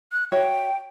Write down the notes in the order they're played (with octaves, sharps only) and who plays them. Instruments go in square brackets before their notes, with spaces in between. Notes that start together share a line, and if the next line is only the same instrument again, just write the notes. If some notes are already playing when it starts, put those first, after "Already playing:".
[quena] F#6
[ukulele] F#4 C#5 E5 [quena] G5